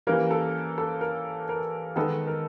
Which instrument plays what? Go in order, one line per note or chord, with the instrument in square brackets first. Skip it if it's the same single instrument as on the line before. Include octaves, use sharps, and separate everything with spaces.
[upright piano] E3 G3 A#3 C#4 A#4
A4
A4
A#4
A#4
D#3 G#3 B3 A4
A#4